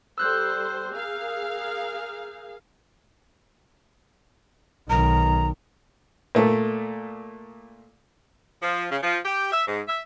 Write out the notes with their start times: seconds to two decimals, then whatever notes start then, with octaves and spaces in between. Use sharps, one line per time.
0.18 G3 A4 C5 E6 F#6 G6
0.91 G#4 A#4 F5
4.89 B1 D#3 A#5
6.35 A#2 A3
8.62 F3
8.90 C#3
9.02 F3
9.25 G4
9.52 E5
9.67 G#2
9.88 E5